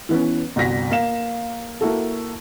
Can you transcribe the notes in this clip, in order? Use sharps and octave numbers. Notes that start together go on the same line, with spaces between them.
E3 B3 C#4
G1 C2 F#4 A#6 B6
A#3 F5 E7
A#3 E4 F#4 A4